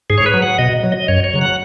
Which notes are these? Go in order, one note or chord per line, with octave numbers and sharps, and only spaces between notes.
G#2 G#4
C#5
B4
F#3
F#5
B2 D#5
F#3
D#5
F#2 C#5
C#5
C#3 F#3
F#5